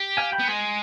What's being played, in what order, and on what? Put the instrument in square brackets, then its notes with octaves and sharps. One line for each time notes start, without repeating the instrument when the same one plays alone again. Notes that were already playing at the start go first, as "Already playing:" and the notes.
Already playing: [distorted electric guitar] G4
[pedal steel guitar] F5 G#5
G5 B5
[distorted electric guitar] B3
[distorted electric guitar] G#3 [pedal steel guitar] G#5 C6